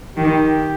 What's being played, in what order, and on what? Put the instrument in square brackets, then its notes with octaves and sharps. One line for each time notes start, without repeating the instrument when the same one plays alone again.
[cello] D#3 [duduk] G4